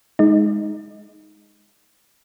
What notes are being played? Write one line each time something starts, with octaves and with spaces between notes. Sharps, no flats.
G#3 D#4